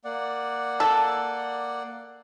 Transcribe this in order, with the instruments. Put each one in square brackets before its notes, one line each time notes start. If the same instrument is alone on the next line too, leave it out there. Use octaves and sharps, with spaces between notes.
[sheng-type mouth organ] A#3 D5 F#5
[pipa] A4